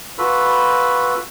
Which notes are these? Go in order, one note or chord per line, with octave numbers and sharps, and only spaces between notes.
F4 F#4 A4 B4 B5